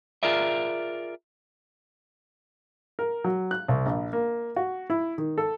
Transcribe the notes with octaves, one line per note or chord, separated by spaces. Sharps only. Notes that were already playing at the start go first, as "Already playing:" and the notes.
F4 G#4 A#4 D5 E5
A#4
F#3
F#6
C2
A#1
A#3
F#4
E4
D#3
A4